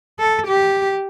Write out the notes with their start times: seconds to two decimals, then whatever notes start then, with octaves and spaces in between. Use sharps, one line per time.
0.20 A4
0.47 G4